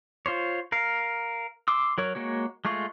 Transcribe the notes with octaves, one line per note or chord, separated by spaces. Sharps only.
F4 C5 C#5
A#4 F5
C6 D6 E6
F#3 A#4 C#5
G#3 A#3 F#4 C#5
G#3 A3 F4 C#6